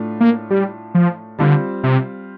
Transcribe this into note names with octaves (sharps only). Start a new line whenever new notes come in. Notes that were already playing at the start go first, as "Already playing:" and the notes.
Already playing: A2 A3 D4 F4
A#3
G3
F3
D3 G3 C4 F4 C5
C3